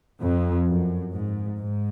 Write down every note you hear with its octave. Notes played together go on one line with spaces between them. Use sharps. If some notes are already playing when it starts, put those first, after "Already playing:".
F2
F#2
G#2
G#2